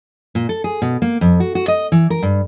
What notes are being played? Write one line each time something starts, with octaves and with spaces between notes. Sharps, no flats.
A#2
A4
G#4
B2
A#3
F2
F#4
F#4
D#5
E3
A#4
G2